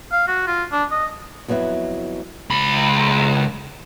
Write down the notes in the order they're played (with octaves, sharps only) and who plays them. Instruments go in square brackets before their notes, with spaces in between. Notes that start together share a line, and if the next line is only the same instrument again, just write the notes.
[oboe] F5
F#4
F4
D4
D#5
[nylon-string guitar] F2 F#3 B3 E4 E5
[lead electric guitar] C#2 B5